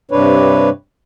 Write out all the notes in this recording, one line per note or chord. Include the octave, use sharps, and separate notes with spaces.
G2 C3 D4 B4 C#5